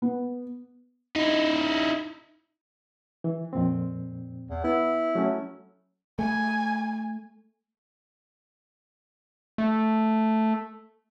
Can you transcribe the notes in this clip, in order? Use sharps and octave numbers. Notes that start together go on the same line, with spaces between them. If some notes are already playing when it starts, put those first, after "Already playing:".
B3
D#4 E4
E3
F2 A#2 C4
E2
B3 E4
F#3 A3 C#4
A3 G#5
A3